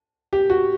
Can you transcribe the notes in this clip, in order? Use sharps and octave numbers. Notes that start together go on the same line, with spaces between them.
G4
F#4